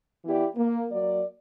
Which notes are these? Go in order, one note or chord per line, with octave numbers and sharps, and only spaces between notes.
E3 B3 E4 G4 D5
A#3
F#3 A#3 D5